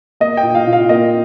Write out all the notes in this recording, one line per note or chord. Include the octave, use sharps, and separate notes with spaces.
A#3 D#5
G5
A#2
F5
A#2
F5
A#3 D#5